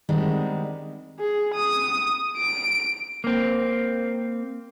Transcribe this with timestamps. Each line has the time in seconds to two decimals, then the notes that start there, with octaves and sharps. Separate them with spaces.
0.09 D#3 G3 G#3 B3 C4 D4
1.20 G#4
1.54 D#6
2.38 D7
3.24 A#3 C4